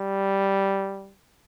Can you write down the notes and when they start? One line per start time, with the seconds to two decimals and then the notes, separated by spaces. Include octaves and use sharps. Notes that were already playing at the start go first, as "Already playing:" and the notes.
Already playing: G3